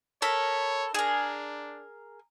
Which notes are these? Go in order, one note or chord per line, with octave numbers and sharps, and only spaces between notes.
A4 A#4 C#5 B5
D4 G#4 A#4